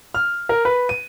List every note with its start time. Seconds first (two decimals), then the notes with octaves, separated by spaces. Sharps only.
0.15 F6
0.49 A#4
0.65 B4
0.89 D#7